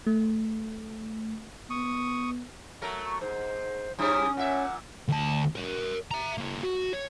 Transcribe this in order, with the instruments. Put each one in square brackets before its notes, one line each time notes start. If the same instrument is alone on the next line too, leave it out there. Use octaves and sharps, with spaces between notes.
[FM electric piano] A3
[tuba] B3 [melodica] C#6 D#6
[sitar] F#3 A3 A#4
[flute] C#6
[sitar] G#2 [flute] C5
[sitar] G2 G3 E4 [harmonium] C#4 [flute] D#6
[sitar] A#2 E5 [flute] F#5
[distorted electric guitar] D2 A5
A#4 C#5
E5 A#5
A#3 E4
F#4
C#5